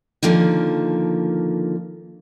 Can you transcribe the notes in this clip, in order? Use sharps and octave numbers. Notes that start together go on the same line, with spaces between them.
D3 D#3 F3 A#3